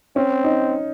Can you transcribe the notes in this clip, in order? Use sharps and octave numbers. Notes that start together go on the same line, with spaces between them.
C4 C#4
D#4